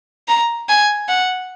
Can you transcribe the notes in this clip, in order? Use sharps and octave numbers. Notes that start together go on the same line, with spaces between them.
A#5
G#5
F#5